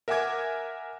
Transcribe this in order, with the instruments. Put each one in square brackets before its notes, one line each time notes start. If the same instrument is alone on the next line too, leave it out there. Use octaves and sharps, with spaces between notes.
[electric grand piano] A#4 E5 F#5 G#5 D6 G#6